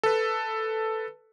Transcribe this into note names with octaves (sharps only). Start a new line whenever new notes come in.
A4 B4